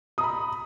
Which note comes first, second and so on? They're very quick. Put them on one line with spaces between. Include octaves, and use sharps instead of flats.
D#6 A#5 B5